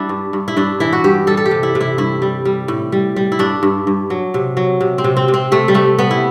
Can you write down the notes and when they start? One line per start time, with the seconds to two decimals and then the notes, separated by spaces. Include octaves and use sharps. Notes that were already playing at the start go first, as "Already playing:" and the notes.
Already playing: G3 D4 E4
0.09 G2
0.33 G2
0.48 E4
0.57 G2 D4
0.80 E3 E4
0.93 F#4
1.04 G2 G4
1.27 G3 A4
1.37 A4
1.46 G4
1.51 C3
1.63 E4
1.75 C3
1.81 E4
1.98 G2 E4
2.22 G3
2.45 G3
2.68 A2
2.92 G3
3.16 G3
3.32 E4
3.39 G2 D4
3.63 G2
3.87 G2
4.10 F#3
4.34 C3
4.57 F#3
4.81 C3
4.98 C4
5.04 C3
5.17 C4
5.28 C3
5.34 C4
5.52 C3 A3
5.68 G3
5.74 C3 A3
5.98 G3 B3
6.11 E4